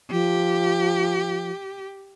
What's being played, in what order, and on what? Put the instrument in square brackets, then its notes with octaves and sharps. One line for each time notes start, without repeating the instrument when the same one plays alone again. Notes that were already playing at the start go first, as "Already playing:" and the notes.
[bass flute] F3 [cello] G4